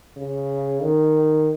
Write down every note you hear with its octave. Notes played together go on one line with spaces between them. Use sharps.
C#3
D#3